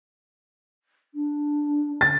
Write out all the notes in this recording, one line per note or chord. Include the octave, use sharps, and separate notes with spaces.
D4
D3 A6